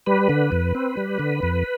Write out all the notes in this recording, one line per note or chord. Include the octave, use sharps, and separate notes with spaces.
G3 B4
D3
F2
C4
G3
D3
F2